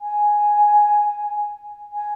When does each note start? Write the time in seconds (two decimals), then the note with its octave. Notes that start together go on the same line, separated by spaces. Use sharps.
0.01 G#5
1.93 G#5